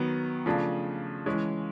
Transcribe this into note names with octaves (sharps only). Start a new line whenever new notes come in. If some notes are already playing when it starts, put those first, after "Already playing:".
Already playing: D#3 F#3 B3
C#3 F3 A3 D4
E3 G#3 C#4